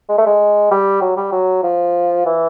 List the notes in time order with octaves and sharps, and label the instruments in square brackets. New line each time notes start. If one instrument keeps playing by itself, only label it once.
[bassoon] G#3
A3
G#3
G3
F#3
G3
F#3
F3
E3